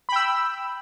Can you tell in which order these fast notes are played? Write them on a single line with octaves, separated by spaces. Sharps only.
B5 G5 E6